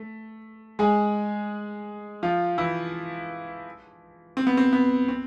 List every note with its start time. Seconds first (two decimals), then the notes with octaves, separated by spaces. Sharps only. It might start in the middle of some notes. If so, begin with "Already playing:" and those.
Already playing: A3
0.79 G#3 G#4
2.23 F3 F4
2.58 E3 E4
4.37 C4
4.47 B3
4.57 C4
4.73 B3
5.09 C4